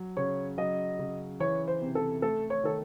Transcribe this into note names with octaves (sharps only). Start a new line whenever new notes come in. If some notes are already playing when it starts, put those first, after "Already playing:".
Already playing: F#3
C#3 C#5
F#3 D#5
C#3
E3 C#5
C5
C3
A4
A3 A4
C#5
D#3 A4